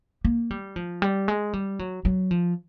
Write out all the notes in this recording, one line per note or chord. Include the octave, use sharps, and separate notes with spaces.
A#3
G3
F3
G3
G#3
G3
F#3
F#3
F3